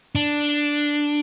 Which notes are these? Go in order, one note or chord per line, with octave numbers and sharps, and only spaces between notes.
D4